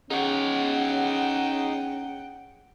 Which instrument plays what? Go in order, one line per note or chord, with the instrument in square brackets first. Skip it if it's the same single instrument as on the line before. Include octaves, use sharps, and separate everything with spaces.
[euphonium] C#4 [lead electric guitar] D#4 C#5 [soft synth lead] G#4 [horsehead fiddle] F#5 G5